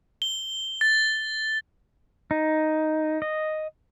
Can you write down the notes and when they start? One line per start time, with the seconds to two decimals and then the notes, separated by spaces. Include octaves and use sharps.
0.22 G7
0.81 A6
2.31 D#4
3.22 D#5